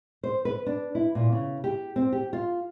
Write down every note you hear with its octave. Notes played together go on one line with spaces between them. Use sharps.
C5
B4
D4
E4
A#2
C#3
G4
C4
G4
F4